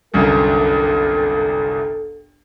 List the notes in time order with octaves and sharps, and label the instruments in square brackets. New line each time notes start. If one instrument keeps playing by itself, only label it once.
[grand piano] G1 C2 F#2 [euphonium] A4